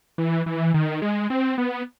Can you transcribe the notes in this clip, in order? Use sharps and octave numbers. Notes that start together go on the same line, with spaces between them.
E3
E3
D#3
G#3
C4
B3